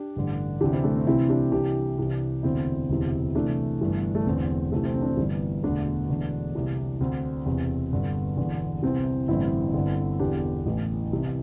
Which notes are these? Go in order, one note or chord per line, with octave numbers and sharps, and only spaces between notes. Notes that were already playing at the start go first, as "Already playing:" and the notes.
Already playing: D4 G4
A1 G2 D3
D2 C3 E3 D4 G4
C4 E4
A3 D4
C4
C2 C3 E3 C4 E4
D4 G4
C2 C3 E3 D4 G4
C2 C3 E3
E1 D2 D3 C4 E4
E1 D2 C3 E3
C2 C3 E3 A3 D4
G1 G2 E3
A3
E1 E2 D3 C4
C2 C3 E3 A3
C4
C4
D4
C4
G1 G2 E3
E1 D2 D3 A3 D4
E1 E2 D3
C2 C3 E3
D2 D3 C4
E1 E2 C3
G1 G2 D3
E1 E2 D3
C2 C3 E3 C4
A1 G2 D3 C4 E4
G1 G2 D3
E1 E2 D3 D4 G4
A1 A2 E3
C2 C3 E3